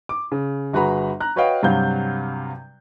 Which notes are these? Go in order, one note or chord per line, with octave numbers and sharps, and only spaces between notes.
D6
C#3
G1 F#4 G#4 B4 A#5 B5
A#5 F#6
F#4 B4 C#5 D#5 F5 G5
G2 C3 F#3 F#4 F5 G6